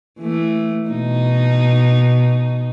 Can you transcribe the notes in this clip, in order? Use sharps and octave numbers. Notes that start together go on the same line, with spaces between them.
E3 A3
B2 D#4